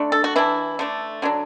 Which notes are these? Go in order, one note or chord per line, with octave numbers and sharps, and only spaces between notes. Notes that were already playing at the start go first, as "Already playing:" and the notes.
Already playing: D3 A3 D4
A4
F#4
E3 D4 E4
D3 A3 D4
D3 F#3 D4